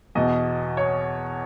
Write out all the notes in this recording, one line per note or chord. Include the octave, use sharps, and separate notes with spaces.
E2 B2 D#5
C#5